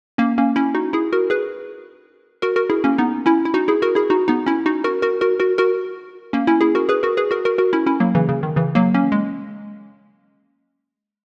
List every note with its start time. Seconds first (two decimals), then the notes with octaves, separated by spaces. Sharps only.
0.18 A#3 C#4
0.38 A#3 C#4
0.56 C#4 E4
0.75 D#4 F#4
0.93 E4 G#4
1.13 F#4 A#4
1.30 G#4 B4
2.42 F#4 A#4
2.56 F#4 A#4
2.70 E4 G#4
2.84 A#3 C#4
2.98 B3 D#4
3.26 C#4 E4
3.45 E4
3.54 D#4 F#4
3.68 E4 G#4
3.82 F#4 A#4
3.95 E4 G#4
4.10 D#4 F#4
4.28 B3 D#4
4.46 C#4 E4
4.66 D#4 F#4
4.84 F#4 A#4
5.02 F#4 A#4
5.21 F#4 A#4
5.40 F#4 A#4
5.58 F#4 A#4
6.33 A#3 C#4
6.47 C#4 E4
6.61 E4 G#4
6.75 F#4 A#4
6.89 G#4 B4
7.03 F#4 A#4
7.17 G#4 B4
7.31 F#4 A#4
7.45 F#4 A#4
7.58 F#4 A#4
7.73 C#4 E4
7.86 C#4 E4
8.00 F#3 A#3
8.15 C#3 E3
8.29 C#3
8.43 D#3
8.56 C#3 E3
8.75 F#3 A#3
8.94 A#3 C#4
9.12 G#3